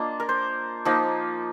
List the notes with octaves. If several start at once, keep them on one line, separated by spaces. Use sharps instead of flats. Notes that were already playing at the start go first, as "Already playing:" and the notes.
Already playing: A#3 D4 F4 D#5
A#4
C5
F3 A#3 D#4